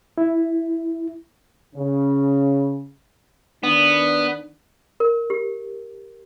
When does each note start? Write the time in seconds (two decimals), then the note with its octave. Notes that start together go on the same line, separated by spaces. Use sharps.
0.18 E4
1.76 C#3
3.63 D#3 B3 D4
5.00 A#4
5.30 G4